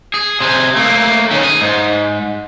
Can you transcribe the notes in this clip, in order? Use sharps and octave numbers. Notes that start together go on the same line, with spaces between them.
G#4
C3 G#4
A3 A#3
D#3 C#4
G#4
G#2